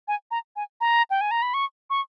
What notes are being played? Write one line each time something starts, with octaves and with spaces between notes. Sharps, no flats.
G#5
A#5
G#5
A#5
G5
G#5
A#5
B5
C#6
C#6